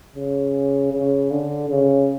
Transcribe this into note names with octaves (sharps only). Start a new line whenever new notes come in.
C#3
C#3
D3
C#3